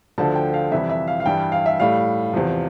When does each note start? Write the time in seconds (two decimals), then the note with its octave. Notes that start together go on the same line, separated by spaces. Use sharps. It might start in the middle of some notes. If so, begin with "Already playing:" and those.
0.18 D2 D3 F3 A5
0.35 G5
0.54 F5
0.72 F2 C3 E3 G3 E5
0.90 E5
1.08 F5
1.20 F5
1.26 G2 E3 G3 G5
1.52 F5
1.66 E5
1.80 A2 G3 F5
2.33 E2 C3 F3